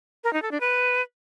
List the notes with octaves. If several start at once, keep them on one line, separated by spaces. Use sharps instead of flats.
A#4
D#4
A4
D4
B4